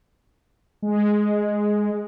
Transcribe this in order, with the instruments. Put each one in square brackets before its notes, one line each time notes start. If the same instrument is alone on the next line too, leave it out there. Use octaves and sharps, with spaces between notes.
[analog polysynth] G#3